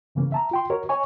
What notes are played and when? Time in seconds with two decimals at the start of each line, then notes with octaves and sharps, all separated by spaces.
0.15 G2 C#3 E3 A#3 C#4
0.32 E5 A5 A#5
0.51 F4 G5 C6
0.70 F#4 A#4 C#5 D#5
0.89 C#5 D#5 G#5 C#6